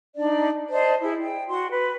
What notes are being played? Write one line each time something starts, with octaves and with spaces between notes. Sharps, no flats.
D4 D#4 D5
C5 D5 D#5 A5
E4 G#4
G5
F#4 C6
B4